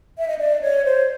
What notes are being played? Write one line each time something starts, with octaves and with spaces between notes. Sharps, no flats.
E5
D#5
D5
C#5
C5